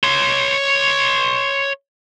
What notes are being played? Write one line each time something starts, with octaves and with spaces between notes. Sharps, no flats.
C#5 C6